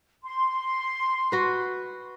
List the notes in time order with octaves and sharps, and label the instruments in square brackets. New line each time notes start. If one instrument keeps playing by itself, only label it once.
[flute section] C6
[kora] F#4 B4